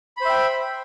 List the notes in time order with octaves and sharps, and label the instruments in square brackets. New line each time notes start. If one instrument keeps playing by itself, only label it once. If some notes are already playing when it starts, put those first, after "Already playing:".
[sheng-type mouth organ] B5
C5
E5
G5